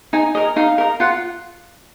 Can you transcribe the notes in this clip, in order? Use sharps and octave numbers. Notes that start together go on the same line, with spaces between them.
D#4 G#5
A#4 D#5
D#4 F5
A#4 D#5
F4 F#5